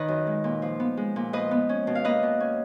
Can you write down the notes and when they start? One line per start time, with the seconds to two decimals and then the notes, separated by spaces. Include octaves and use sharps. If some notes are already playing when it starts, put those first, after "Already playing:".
Already playing: D#3 B4 C#5 D#5
0.08 F#2
0.27 G#3
0.44 A#2
0.62 F3
0.80 B3
0.97 G#3
1.16 A#2
1.33 F3 B4 D#5
1.51 B3
1.69 C#4
1.87 B2
1.95 F5
2.04 A#3 B4 D#5
2.23 B2
2.40 C#4